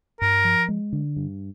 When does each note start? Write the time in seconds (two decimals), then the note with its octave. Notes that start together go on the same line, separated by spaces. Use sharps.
0.21 G2 A#4
0.44 F3
0.68 G#3
0.93 D3
1.16 G2